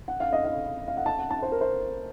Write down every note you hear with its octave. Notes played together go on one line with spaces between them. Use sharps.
F#5
F5
D#5
F5
F5
F#5
A5
F#5
A5
C5
A#4
C5